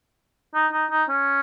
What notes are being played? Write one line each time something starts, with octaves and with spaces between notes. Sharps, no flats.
D#4
D#4
D#4
C#4